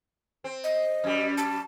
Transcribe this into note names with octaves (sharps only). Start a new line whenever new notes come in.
C4
D#5
F#2 G3
A5